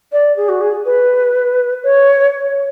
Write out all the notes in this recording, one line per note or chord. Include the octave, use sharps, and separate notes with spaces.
D5
G#4
F#4
G#4
B4
C#5